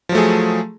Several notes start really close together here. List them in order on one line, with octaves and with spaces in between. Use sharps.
F3 F#3 A3 G#4